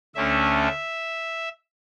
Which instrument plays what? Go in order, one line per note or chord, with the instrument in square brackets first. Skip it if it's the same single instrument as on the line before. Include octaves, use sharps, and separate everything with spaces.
[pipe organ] D2 D3 A3 C#4 E5